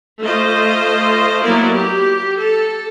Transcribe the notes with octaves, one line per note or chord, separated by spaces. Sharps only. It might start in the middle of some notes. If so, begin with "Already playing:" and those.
A3 F4 C5 D#5
F#3 A#3 B3 E4 A#4 D5
G4
A4